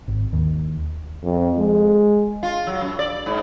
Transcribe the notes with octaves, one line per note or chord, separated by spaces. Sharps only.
G#1
D#2
F2
G#3
F4
F#3
F#2
D5
G#2